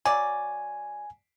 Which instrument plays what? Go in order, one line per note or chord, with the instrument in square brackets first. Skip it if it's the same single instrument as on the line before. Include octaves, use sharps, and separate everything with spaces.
[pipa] F#3 D5 [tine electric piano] G#5